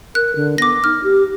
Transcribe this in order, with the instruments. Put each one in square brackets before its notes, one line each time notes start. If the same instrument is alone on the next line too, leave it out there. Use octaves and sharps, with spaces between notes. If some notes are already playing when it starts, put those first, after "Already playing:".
[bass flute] A#4 [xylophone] F#6
[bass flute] D3
[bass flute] B3 [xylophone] D6 A#6
[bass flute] D#4 [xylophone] F6
[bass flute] G4